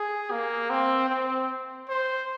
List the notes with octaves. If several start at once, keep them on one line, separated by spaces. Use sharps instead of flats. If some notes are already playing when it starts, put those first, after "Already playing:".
Already playing: G#4
A#3
C4
C4
C5